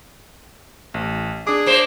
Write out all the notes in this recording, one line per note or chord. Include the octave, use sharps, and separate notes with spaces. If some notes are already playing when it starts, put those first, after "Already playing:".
A1
D4 G#4 D6
A#3 C5